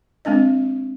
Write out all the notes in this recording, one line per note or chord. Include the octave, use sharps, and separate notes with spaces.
G#3 C4 D4 D#5